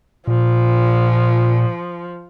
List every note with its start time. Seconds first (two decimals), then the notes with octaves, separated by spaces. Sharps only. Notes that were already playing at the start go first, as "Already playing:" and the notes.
0.27 A#2 F3